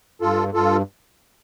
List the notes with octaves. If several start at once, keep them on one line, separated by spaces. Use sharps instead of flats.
G2 F4 A4
G2 F4 A4